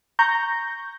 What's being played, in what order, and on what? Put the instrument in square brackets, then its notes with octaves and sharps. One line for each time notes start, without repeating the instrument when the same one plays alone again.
[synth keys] A#5 C#6 G6 A#6